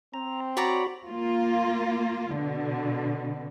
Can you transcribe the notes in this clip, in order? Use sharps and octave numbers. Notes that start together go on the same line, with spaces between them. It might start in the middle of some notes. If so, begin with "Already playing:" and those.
C4 A#5
F#4 C#5 D5 A#5 B5
A#3 F4
B2 D3